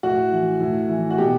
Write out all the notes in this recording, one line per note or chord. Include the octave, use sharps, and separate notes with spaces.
A2 F#4
E3
A2
E3
F#4
B2 G4